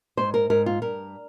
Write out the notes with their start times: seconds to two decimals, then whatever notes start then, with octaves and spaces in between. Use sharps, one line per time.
0.17 G#2 C5
0.34 A#4
0.50 G#2 A#4
0.66 F4
0.82 G2 A#4